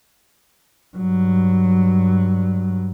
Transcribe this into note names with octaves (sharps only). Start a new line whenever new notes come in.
G2 F#3